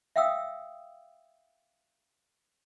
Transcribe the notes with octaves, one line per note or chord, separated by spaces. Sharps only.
E5 F5 G5 D#6 E6